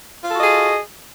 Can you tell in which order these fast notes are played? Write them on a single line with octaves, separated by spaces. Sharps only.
F4 A4 F#4 D#5 G#4